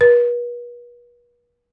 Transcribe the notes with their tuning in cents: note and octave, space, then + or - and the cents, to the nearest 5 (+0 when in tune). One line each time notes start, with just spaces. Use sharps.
B4 -40